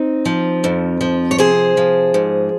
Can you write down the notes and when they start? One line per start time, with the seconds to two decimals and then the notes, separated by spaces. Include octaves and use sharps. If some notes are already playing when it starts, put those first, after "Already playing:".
Already playing: C4 D#4
0.25 F3
0.64 F2
1.01 F3
1.31 C#5
1.38 C3 G#4 C5
1.77 F3
2.14 G#2